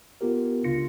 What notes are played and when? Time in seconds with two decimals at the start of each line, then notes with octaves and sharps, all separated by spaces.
0.21 B3 F4 G4 A#4
0.64 C#2 C#3 D4 F4 A#6 C#7